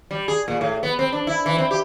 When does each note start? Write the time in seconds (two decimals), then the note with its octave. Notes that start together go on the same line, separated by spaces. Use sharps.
0.11 G3
0.28 G#4
0.48 A#2
0.61 A2
0.83 B3
0.99 C4
1.12 D4
1.27 E4
1.46 E3
1.58 C4
1.71 G4